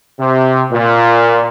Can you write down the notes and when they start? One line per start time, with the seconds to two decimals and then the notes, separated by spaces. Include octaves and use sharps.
0.19 C3
0.71 A#2